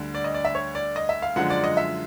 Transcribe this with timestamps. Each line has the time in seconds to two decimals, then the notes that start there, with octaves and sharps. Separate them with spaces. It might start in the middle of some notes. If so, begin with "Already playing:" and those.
Already playing: D2 D3 G3
0.15 D5
0.24 D#5
0.34 D5
0.45 E5
0.55 C#5
0.75 D5
0.96 D#5
1.09 E5
1.22 F5
1.36 F#2 D3 F3 G#3 F#5
1.50 D5
1.64 D#5
1.77 E5